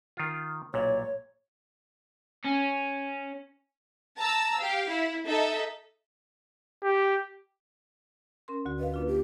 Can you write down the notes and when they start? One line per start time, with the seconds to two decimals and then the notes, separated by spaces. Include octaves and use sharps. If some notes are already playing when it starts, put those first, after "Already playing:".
0.17 D#3 F4
0.74 B1 A#2 C#5
2.44 C#4
4.17 A5 A#5 E6
4.58 G4 F5
4.88 E4
5.26 D#4 A4 D#5 E5
6.83 G4
8.48 C#4 A#4 C6
8.65 D2 D3 F#4
8.80 B4 D#5 F5
8.94 A#3 D4 F4
9.08 G4